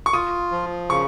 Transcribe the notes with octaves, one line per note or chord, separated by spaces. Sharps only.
C#6
F4 D#6
F3
C#3 C#6